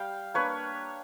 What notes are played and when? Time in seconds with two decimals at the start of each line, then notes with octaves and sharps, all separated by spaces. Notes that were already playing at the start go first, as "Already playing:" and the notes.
Already playing: G3 F5 G5
0.34 A#3 D4 B4 C#5